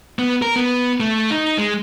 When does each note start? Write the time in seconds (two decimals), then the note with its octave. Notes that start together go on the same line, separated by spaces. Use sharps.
0.19 B3
0.42 A#4
0.56 B3
1.00 A3
1.31 D#4
1.58 G#3